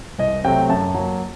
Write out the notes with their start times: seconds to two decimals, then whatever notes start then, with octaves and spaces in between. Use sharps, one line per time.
0.19 C2 D#5
0.44 C3 F#3 A3 G5
0.70 F#2 A5
0.94 F#3 A#3